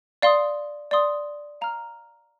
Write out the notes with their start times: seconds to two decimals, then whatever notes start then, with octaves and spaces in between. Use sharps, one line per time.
0.22 D5 F5 C6 D#6
0.91 D5 F5 C6 D#6
1.61 F5 A#5 F6